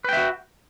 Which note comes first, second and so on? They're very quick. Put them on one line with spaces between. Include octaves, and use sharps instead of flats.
B4 G5 E5 F#4